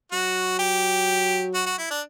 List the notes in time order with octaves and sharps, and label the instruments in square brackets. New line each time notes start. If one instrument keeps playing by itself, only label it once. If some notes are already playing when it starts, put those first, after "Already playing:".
[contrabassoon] F#3 [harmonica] F#4
[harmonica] G4
F#4
F#4
E4
D4